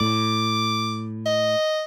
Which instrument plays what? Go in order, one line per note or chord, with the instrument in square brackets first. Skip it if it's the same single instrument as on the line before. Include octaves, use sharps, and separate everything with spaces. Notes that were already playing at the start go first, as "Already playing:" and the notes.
[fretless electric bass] A2 [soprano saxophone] D6
[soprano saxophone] D#5